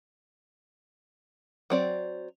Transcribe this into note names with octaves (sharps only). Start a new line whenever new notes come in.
F#3 C4 D5